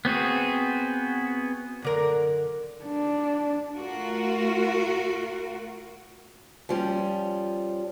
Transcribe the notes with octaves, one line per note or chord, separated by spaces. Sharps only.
B3 C4 F#4 G#4
F#2 D3 A#4
D4
A3 F4 F#4 A#4
F3 G3 C#4